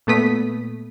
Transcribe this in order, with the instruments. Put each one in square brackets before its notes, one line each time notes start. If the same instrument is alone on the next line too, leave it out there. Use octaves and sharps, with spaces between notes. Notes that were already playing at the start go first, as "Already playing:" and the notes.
[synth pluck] A#2 A3 B3 D#6 B6